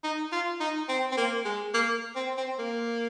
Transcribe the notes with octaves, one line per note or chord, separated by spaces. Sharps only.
D#4
F4
D#4
C4
C4
A#3
G#3
A#3
C4
C4
A#3